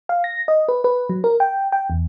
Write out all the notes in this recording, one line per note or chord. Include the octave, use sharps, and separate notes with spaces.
F5
A#6
D#5
B4
B4
F#3
A#4
G5
G5
E2